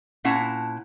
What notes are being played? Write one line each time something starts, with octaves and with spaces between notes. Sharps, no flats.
A#2 C#4 E4 F#5 A5